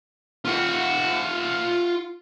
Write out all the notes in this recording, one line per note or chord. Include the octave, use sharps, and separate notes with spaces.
F4 F#5